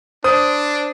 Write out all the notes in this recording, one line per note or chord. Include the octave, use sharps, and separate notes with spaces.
D4 C5 D#6